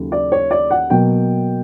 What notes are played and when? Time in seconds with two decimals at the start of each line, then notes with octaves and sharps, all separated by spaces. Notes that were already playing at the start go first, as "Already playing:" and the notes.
Already playing: D#2 C#3 F#3 A3
0.12 D5
0.32 C#5
0.51 D5
0.71 F#5
0.90 B2 F#3 A#3 G5